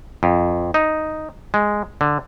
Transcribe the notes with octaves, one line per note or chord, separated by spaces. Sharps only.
F2
D#4
G#3
D3